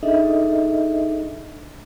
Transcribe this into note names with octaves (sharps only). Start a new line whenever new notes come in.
D4 D#4 G#4 A4 D#5 E5